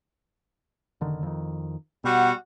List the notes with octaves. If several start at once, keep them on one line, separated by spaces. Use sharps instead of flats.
F1 D3 D#3
F2 D#3
B2 G3 F#4 F#5